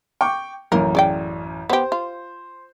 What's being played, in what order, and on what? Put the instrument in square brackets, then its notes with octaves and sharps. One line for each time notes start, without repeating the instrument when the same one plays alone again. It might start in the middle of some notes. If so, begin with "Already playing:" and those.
[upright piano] G5 C#6 D6
[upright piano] A1 F#2 [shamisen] A#3 A#4
[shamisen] C#3 D5 G5
[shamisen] B3 G4 [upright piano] C5
[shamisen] F4